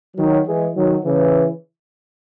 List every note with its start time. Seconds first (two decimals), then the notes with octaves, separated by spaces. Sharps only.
0.17 D#3 F#3
0.46 E3 G#3
0.75 D#3 F#3
1.04 C#3 E3